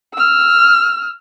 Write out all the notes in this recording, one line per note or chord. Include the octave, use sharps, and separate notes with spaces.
E6 F6